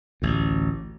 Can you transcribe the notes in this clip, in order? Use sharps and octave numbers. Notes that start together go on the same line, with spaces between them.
A1 D2